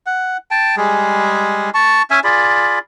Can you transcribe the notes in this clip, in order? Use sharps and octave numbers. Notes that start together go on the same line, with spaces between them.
F#5
G5 A5
G3 G#3 G#4
A5 C#6
C#4 E5 G#5
F4 G#4 D5 B5